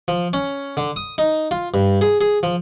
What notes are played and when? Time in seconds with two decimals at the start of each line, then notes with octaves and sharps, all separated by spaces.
0.08 F3
0.33 C#4
0.77 D3
0.96 D#6
1.18 D#4
1.51 F4
1.74 G2
2.01 G#4
2.21 G#4
2.43 F3